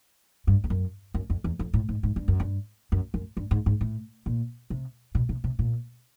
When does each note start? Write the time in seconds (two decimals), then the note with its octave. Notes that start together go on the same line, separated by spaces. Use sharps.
0.47 G2
0.64 F2
0.70 F#2
1.14 F#2
1.30 F2
1.44 E2
1.59 F2
1.74 A2
1.89 G#2
2.03 G#2
2.16 G2
2.28 F#2
2.40 G2
2.92 F#2
3.14 F#2
3.37 G2
3.51 G#2
3.66 G#2
3.81 A2
4.26 A#2
4.70 C3
5.15 B2
5.29 C3
5.44 C3
5.59 A#2